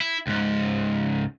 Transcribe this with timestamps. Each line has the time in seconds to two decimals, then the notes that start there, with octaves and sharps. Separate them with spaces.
0.01 E4
0.27 C#2 G#2